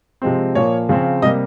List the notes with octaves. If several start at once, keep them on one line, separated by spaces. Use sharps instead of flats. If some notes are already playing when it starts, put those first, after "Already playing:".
C3 F3 G#3 C4
A#2 F3 A#3 C#5
C#3 F3 C4
C3 G3 A#3 D#5